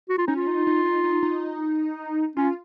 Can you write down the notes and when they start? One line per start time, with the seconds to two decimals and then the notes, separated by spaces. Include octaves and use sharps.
0.09 F#4
0.18 F4
0.27 C#4 D#4
0.36 F4
0.47 D#4
0.67 D#4
0.85 D#4
1.04 D#4
1.23 D#4
2.36 C#4 F4